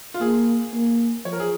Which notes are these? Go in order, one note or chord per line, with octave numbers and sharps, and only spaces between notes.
F4
A#3 G#4
A#3
F3 C#5
A#4
G#4